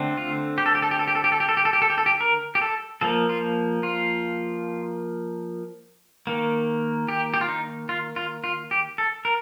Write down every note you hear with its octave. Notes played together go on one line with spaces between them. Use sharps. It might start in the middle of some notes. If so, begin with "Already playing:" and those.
Already playing: D3 A3 C4
F4
G4
A4
G4
A4
G4
A4
G4
A4
G4
A4
G4
A4
G4
A4
G4
A4
G4
A4
G4
A#4
G4
A4
F3 A#3 A4
F4
F4
D#3 A#3
G4
G4
F4
D#4
F4
F4
F4
G4
A4
A#4